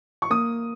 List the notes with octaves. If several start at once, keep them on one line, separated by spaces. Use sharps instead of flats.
C#6
A#3 D#6